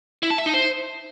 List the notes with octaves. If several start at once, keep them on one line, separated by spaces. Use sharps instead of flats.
E4
A5
E5
D#4
C5